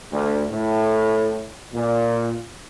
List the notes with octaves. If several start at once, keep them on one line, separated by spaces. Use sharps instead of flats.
D2
A2
A#2